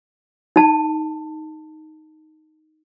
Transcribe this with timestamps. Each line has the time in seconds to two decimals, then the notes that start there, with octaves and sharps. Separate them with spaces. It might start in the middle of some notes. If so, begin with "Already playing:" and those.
0.56 D#4 A5